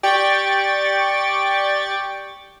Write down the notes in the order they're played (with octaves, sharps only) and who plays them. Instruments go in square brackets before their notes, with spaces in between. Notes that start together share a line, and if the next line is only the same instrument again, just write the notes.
[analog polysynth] G4 D5 G5 C#6 A6